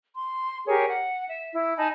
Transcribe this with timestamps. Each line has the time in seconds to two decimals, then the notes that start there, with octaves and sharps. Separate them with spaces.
0.15 C6
0.68 G4 G#4 A#4 C#5
0.89 F#5
1.27 E5
1.53 E4
1.77 D#4 G#5 A5 B5